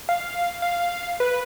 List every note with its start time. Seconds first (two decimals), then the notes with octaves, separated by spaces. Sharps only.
0.09 F5
0.62 F5
1.20 B4